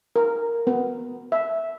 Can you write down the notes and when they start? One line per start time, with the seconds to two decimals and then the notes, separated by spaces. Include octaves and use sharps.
0.16 A#4
0.67 B3
1.32 E5